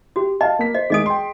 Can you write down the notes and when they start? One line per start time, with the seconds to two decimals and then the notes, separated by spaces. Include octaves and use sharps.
0.16 F#4 G4
0.41 D#5 F5 A5
0.59 A#3 B6
0.74 C5 D#5
0.90 D#3 G#3 G#4 D#5 D#6 D7
1.06 G5 C6